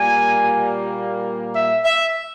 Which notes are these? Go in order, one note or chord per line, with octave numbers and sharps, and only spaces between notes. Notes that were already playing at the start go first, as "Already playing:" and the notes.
Already playing: A#2 G3 A#3 G#5
E5
E5